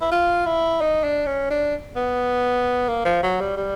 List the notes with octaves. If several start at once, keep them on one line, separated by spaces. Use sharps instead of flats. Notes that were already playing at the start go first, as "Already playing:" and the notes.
E4
F4
E4
D#4
D4
C#4
D4
B3
A#3
F3
F#3
G3
G3